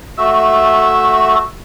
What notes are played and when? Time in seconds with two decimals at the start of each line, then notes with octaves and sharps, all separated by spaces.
0.18 A3 F#4 E5 E6